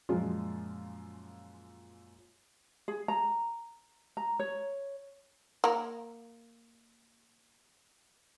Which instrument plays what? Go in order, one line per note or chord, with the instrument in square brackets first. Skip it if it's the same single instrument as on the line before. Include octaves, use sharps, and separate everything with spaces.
[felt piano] F#2 A#2 F3 G#3 F4
[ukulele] G#4
A#5
A#5
C#5
[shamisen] A#3 A#4